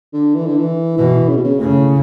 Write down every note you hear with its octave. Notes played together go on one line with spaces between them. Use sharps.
D3
E3
D3
E3
B2 E3
C#3
B2
C#3
A2 C#3